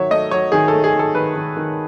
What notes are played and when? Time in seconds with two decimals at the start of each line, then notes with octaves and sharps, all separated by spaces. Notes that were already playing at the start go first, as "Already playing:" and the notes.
Already playing: D#3 F#3 C#5 E5
0.10 A3 D#5
0.31 F#3 C#5
0.52 D#3 G#4
0.68 A4
0.73 A3
0.84 G#4
0.93 D#3
0.99 A4
1.15 D#3 B4
1.36 D#3
1.57 D#3